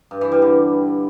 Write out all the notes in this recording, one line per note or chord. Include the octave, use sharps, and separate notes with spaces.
G2
E3
G3
D3